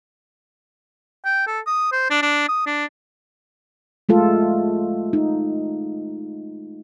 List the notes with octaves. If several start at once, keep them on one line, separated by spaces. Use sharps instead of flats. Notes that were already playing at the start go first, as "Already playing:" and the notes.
G5
A4
D#6
C5
D4
D4
D#6
D4
G#3 A3 F4 A4
D#4